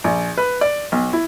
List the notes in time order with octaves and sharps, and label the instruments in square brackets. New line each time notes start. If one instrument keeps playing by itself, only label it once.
[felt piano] A#1
B4
D5
B1
E4